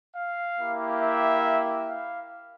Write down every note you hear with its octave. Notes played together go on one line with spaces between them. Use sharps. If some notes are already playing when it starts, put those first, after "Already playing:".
F5
A#3 E4 G4
E5
F5